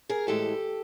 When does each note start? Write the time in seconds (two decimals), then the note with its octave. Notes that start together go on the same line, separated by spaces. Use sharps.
0.09 G#4 A#4
0.27 A2 E3 G#3 G4 A4